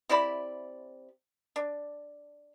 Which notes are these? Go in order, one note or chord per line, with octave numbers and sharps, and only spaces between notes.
C3 E4 D5 B5
D4